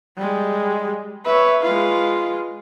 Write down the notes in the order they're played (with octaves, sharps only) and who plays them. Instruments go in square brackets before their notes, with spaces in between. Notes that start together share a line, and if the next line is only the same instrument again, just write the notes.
[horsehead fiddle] G3 G#3
[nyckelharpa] B4 C#5 [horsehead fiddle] E5
[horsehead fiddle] G#3 F4 [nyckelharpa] B4 F5